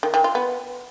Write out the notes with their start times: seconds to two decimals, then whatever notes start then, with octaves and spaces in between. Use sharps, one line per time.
0.03 D#3
0.14 D#3
0.24 F4
0.35 B3